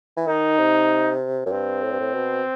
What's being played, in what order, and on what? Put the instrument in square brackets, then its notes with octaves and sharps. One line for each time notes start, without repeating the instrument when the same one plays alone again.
[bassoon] E3
[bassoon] D#3 [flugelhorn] D#4
[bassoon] C3
F#2
[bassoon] G2 [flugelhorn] C4
[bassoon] A2
G2
A2
B2